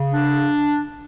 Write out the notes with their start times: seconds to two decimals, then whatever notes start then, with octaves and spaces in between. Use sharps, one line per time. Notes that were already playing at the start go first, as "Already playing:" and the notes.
Already playing: C#3
0.13 D4